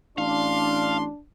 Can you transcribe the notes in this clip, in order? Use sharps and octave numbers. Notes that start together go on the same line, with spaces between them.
A1 D4 F5 C6